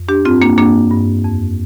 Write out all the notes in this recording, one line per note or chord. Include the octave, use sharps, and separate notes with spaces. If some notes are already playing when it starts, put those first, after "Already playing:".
Already playing: F2
D4 G4
G2 C4 F4
A#3 D4
G2 A#3 D4
G2
F2